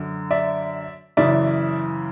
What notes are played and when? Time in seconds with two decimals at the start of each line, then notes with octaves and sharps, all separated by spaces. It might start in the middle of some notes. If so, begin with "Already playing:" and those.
Already playing: F#2 D3
0.31 D5 E5
1.17 F#2 C#3 E3 D5 E5